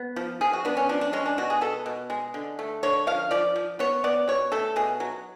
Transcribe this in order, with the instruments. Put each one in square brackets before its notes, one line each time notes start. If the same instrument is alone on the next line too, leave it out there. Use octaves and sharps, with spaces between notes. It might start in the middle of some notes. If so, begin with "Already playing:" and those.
Already playing: [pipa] B3
F3
F3 G#4
F#4
B3 D4
C#4
F3 D4
D4
G#3 C#4
D4
B2 F#4
G#4
B3 A4
B2
G#3
D3
A3
D3 C#5
F3 F5
F3 D5
F3
B3 C#5
B3 D5
B2 C#5
A3 A4
B2 G#4
F#3